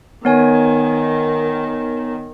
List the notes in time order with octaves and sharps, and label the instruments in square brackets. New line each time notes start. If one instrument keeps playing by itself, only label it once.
[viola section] D#3 [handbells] B3 C#5 G#5